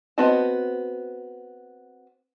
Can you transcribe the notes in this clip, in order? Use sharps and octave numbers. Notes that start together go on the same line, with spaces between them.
B3 C4 F#4 D#5 A5